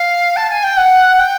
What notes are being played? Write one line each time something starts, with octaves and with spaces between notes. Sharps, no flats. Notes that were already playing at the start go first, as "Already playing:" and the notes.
Already playing: F5
A5
G#5
G5
F#5
G5